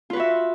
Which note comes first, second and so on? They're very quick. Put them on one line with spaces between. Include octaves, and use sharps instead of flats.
F4 B4 F#4 E5